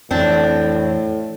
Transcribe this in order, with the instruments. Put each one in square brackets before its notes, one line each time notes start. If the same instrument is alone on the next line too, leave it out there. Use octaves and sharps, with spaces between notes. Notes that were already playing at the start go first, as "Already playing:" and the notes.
[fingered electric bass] F2 E3 [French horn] A2 [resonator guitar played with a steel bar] C4 D4